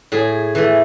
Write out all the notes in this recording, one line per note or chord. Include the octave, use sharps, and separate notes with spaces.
A2 G#4
E3 A3